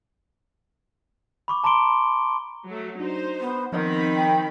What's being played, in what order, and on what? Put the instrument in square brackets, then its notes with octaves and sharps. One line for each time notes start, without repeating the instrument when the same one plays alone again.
[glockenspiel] B5 C#6 D6
A5 A#5 C6 D6 D7 G7
[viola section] F#3 A3
[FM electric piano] D4 F#4 [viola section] D#4 C5
[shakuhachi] B3
[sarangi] D#3 [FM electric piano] F3 D#5 G6 [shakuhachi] B3 [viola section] C4 D#4 B5
[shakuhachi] G5